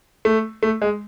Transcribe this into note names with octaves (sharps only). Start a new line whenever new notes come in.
A3
A3
G#3